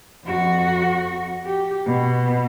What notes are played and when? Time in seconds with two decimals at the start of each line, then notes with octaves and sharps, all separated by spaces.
0.24 F2 F#4
1.45 G4
1.86 B2